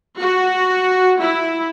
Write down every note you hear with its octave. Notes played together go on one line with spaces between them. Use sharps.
F#4
E4